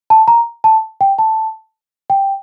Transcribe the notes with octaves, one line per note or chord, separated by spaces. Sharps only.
A5
A#5
A5
G5
A5
G5